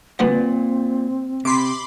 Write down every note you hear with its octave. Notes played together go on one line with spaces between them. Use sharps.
D2 A#2 G3 B3 C4
C3 B5 C6 D6